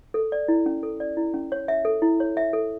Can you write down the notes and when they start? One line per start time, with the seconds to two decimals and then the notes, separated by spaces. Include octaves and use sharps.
0.14 A4
0.32 D5
0.48 E4
0.66 C#4
0.83 A4
1.00 D5
1.17 E4
1.34 C#4
1.52 C#5
1.68 E5
1.85 A4
2.02 E4
2.20 C#5
2.37 E5
2.53 A4